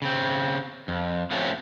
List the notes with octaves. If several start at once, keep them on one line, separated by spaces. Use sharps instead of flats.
C#3 C4
F2
F3 F#3 A3 C4 C#4